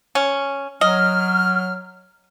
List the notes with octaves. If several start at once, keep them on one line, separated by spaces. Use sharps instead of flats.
C#4
F#3 D#5 F6